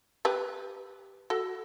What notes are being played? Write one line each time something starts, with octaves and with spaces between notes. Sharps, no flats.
G4 B4
F#4 A4